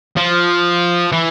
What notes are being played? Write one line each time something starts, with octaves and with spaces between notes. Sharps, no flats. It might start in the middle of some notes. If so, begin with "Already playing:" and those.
F3
E3